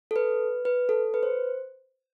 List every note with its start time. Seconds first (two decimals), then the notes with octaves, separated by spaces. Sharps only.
0.11 A4
0.16 B4
0.65 B4
0.89 A4
1.14 B4
1.23 C5